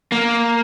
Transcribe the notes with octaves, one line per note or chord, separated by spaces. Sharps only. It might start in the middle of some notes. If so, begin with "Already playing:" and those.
A#3